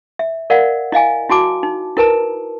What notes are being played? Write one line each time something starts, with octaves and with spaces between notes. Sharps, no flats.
E5
A#4 D5 F5 F#5
E4 D#5 F5 G#5
E4 F#4 A5 D6
D#4
E4 A#4 B4 A5 A#5